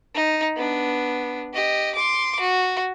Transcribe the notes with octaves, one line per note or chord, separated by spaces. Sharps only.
D#4
B3 D4
G4 D#5
C6 D6
F#4